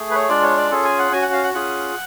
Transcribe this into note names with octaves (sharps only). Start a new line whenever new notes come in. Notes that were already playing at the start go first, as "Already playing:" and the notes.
Already playing: A3 G#4
B4
C#5
G#3 D4 F4 D5
C#5
D5
C#4 F4 G#4 A4
G#5
F#5
C#4 F#4 G#5
F#5
F5
F#5
C#4 F4 G#4 F#5